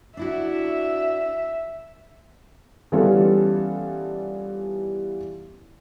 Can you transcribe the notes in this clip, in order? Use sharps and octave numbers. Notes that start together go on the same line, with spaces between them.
D4 E4 F#4 E5
E3 G3 B3 C#4 F4 A4